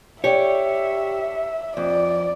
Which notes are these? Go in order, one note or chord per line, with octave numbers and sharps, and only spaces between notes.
G4 C#5 D5 E5
F2 D5